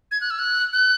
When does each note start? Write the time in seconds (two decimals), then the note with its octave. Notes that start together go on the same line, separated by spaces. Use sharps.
0.11 G#6
0.21 F#6
0.31 E6
0.39 F#6
0.73 F#6